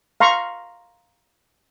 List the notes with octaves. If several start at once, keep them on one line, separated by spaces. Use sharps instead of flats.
F5 A#5 C6 C#6